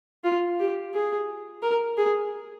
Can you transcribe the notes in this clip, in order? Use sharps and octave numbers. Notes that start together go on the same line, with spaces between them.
F4
G4
G#4
A#4
G#4